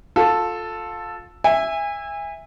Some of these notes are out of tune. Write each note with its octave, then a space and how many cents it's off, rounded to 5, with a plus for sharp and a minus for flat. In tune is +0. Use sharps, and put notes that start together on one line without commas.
F4 +25 A4 +0
E5 +0 G#5 -30